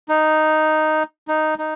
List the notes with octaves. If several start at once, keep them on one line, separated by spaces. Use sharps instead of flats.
D#4
D#4
D#4